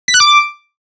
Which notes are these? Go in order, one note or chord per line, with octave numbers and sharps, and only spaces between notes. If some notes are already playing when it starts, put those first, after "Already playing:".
B6
F#6
D6